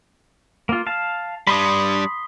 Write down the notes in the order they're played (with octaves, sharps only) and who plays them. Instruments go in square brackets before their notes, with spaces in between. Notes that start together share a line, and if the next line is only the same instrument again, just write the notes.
[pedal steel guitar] A#3 F4
F5 A5
[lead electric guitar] G3 D4 [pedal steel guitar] B5 C6 D#6